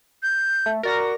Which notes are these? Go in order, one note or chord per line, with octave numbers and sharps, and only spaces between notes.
G6
A3
F#4 A#4 D5 A#6